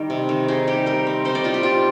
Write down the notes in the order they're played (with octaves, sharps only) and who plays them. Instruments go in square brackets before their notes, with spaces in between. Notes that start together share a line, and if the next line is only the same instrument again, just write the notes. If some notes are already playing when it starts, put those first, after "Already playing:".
Already playing: [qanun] D#3 G3 A#4
C3
D#3
D#4 G#4
G3 G4
G3 A#4
C4
D#4 C5
D5
G3 F4
G4
G3 F4